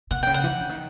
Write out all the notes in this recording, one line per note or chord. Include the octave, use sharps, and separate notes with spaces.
B2 F#5
C#3 G5
F#5
E3
D#3
D3
D#3